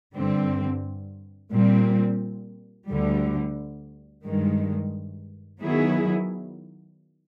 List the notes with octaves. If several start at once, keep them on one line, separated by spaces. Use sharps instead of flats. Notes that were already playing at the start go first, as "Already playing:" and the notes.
G2 D3 G3 C4
A#2 G3 C4
D2 D3 G3
G2 D#3 G#3
D#3 F#3 B3 E4 G#4